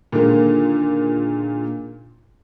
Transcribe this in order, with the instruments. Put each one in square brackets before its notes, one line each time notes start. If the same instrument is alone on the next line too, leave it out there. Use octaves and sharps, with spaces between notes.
[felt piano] A#2 D3 D#3 G#3 A#3